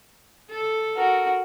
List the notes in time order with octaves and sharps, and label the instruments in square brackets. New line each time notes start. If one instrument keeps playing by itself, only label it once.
[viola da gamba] A4
[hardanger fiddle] F#4 A#4